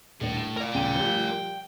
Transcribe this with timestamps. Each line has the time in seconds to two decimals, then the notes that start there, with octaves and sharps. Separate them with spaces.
0.20 D#1 A2 D4
0.37 E7
0.57 A#4 D5
0.74 D#1 C#3 G5 D#7
0.96 F3 G3